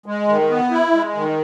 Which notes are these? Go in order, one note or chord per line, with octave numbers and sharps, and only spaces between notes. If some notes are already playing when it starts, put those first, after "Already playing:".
G#3
D#3
B3
E4
G#3
D#3